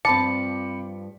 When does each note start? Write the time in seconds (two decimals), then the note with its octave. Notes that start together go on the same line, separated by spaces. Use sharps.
0.05 G2 F3 C4 A5 B5 D6 C#7